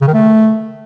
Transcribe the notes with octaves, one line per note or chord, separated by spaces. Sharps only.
C#3
D#3
A3